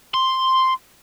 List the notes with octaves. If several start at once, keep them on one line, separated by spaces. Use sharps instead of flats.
C6